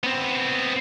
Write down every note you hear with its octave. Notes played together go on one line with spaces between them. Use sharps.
B3 C4